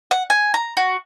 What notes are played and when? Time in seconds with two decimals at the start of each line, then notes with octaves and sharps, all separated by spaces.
0.11 F#5
0.30 G#5
0.54 A#5
0.77 F#4